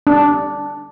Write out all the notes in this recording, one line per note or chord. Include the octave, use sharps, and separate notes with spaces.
D4